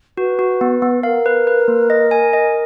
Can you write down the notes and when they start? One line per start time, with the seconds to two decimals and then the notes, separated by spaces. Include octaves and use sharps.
0.17 F#4 B4
0.39 F#4
0.61 B3
0.82 B3
1.03 A#4 F5
1.26 B4
1.47 B4
1.68 A#3
1.90 D#5
2.11 G#5
2.33 D#5